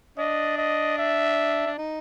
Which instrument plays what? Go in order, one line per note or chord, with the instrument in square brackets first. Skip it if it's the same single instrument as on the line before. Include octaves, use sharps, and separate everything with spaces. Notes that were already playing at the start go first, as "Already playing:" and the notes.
[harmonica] D4 [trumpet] D#5
[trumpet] D#5
E5
[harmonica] D4
D#4